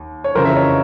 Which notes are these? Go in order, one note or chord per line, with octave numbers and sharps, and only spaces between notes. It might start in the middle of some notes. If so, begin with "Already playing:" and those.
Already playing: D#2
C#5
F2 C#3 E3 A#4 C5
E5
C#5 D#5